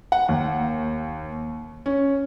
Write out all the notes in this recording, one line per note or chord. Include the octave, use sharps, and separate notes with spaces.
F#5
D#2
C#4